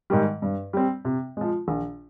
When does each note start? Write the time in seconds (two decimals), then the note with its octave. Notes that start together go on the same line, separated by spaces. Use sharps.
0.10 G#2 D#3 G3
0.42 G2
0.73 G3 C4
1.05 C3
1.37 F3 G#3
1.68 A#1